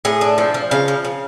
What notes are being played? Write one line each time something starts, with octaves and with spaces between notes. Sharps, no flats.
A2 G#4
D4
F3 A4
F3
C#3 F5
F3
C#3